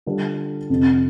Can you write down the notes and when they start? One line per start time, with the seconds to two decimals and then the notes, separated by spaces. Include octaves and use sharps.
0.06 D3 G3 D4 F4 A4
0.70 F2 C3 F3